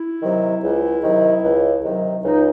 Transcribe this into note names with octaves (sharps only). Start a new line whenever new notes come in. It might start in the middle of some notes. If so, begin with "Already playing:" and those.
Already playing: E4
C3 D#3 F#3
C#2
C3 D#3 F#3
C#2
C3 D#3 F#3
C#2 D#4